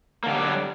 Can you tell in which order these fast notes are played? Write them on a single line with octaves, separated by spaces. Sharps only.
A#3 D3 G4 G3 F#3